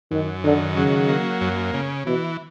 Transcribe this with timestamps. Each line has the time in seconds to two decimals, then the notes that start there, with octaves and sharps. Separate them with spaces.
0.11 F#2 D#3
0.44 D3 D#3
0.76 C#3 F#3
1.09 A#3
1.41 F#2
1.74 C#3
2.06 B2 E3